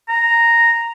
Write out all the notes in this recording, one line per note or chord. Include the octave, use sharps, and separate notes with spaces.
A#5